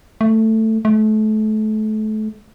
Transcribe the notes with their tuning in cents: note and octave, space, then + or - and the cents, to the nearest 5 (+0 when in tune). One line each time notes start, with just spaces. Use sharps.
A3 +10
A3 -30